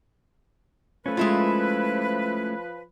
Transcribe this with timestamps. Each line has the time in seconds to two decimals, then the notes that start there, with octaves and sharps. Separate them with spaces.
1.06 F3 A3 C#4 B4
1.17 G#3 E4 F4